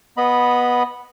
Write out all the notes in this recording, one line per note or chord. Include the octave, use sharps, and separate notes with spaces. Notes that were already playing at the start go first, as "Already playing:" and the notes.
B3 D#5 B5